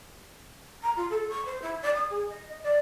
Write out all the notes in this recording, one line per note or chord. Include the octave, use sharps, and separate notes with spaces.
A#5
F4
A4
C#6
C5
E4
D5
D#6
G#4
D#5
D5